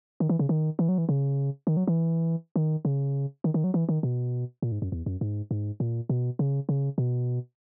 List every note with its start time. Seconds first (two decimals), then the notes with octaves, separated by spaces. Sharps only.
0.20 D#3
0.29 E3
0.39 C#3
0.49 D#3
0.79 E3
0.89 F#3
0.98 E3
1.09 C#3
1.67 D#3
1.77 F#3
1.87 E3
2.56 D#3
2.85 C#3
3.44 D#3
3.54 D#3
3.64 F#3
3.74 E3
3.89 D#3
4.03 B2
4.62 A#2
4.72 G#2
4.82 F#2
4.92 E2
5.06 F#2
5.21 G#2
5.51 G#2
5.80 A#2
6.09 B2
6.39 C#3
6.69 C#3
6.98 B2